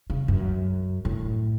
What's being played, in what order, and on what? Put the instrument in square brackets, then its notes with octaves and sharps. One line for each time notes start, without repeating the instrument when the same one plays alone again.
[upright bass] C#3
F#2
A2